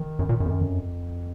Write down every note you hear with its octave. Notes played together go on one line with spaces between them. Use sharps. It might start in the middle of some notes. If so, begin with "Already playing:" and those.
Already playing: D#3
F#2
A#2
F#2
F2
F#2
F2